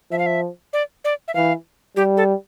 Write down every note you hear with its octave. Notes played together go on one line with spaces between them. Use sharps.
F3 E5
F5
E5
D5
D5
E5
E3 F5
G3 G4
A4